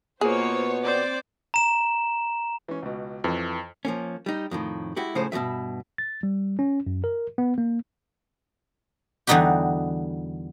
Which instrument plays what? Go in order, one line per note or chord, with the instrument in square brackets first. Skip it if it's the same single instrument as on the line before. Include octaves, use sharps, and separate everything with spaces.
[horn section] B2 B3 [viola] A#3 F4 [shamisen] G#4 [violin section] C5 C#5
[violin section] C4 D5 D6 [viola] C5
[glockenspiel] A#5 E7
[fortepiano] E3 C#4
C#2 B2
[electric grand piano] F2 [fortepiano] E3 B4
[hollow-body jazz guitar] F3 A#3 C#4
G3 D#4
F2 A2 D#3
G#3 E4 F#4 G4
A2 C#3 F3 C#4 G#4 C5
G2 B2 E3 F3 E5
[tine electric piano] A6
G3
C#4
F#2
A#4
B3
A#3
[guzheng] E2 D3 G3 D#4 F#4 G4